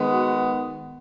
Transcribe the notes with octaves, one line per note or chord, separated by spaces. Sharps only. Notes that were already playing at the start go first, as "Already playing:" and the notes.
Already playing: D#3 G#3 B3
F#4